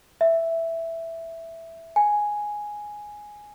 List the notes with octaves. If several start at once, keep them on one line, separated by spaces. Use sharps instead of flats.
E5
G#5